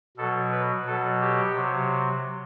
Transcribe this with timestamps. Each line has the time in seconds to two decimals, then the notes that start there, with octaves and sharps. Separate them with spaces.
0.17 B2 F#3 A4
0.52 B4
0.86 B2 F#3 A4
1.21 G4
1.54 C3 F#3